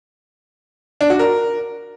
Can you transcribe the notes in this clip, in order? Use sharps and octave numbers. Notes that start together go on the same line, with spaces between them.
D4
F#4
A#4